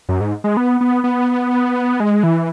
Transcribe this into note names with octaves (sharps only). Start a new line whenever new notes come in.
F#2
G#2
G#3
B3
B3
B3
G#3
E3